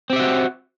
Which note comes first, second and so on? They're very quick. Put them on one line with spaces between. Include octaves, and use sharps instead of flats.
C4 G4 E5 F#4